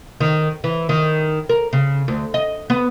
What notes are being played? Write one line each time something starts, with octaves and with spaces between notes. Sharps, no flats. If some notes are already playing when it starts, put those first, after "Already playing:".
D#3
E3
D#3
A#4
C#3
D2
D#5
B3